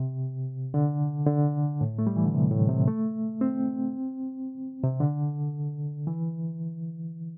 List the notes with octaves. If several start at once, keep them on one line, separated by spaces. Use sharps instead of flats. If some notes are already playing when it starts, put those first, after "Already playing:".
Already playing: C3
D3
D3
A2
A3
G3
E3
D3
C3
A2
C3
A3
C4
C3
D3
E3